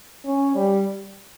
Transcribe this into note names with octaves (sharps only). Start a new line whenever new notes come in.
C#4
G3